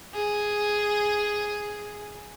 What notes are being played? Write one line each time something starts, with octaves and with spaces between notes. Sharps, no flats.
G#4